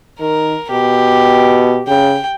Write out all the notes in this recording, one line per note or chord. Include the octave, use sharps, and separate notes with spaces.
D#3 A#4
B2 G4
C#3 G5